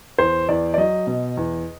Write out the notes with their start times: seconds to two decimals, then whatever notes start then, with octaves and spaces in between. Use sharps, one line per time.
0.19 E2 C5
0.49 E2 D5
0.74 D5
0.78 F#3 D#5
1.07 B2
1.37 E2